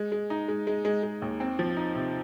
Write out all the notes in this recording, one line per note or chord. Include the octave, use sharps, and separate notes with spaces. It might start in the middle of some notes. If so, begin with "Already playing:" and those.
Already playing: G#3
G#3
D#4
G#3
G#3
G#3
G#3
D#2
C4
F3
D#4
C3